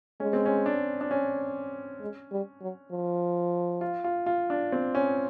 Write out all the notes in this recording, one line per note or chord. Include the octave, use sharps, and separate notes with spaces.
G#3 C#4
C4
C#4
D4
D4
C#4
G#3
G3
F#3
F3
F4
F4
F4
D4
C4
C#4